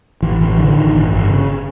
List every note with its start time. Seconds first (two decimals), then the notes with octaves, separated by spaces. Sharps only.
0.22 A1 E3
0.41 A1 E3
0.58 D3 E3
0.76 A1 D#3
0.94 G1
1.12 G1
1.30 C#3